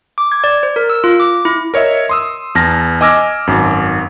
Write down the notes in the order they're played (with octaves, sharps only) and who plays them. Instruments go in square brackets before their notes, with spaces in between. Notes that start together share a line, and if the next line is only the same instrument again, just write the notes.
[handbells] D6
G#6
D5
C5
A#4
E6
F4
D6
E4
[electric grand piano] A#4 C#5 D#5 E5
C6 D#6 E6
E2 A5 F6 A#6
D#5 G#5 D6 E6 F6 A#6
G#1 F#2